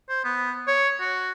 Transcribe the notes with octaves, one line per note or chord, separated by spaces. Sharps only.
C5
B3
C#5
F#4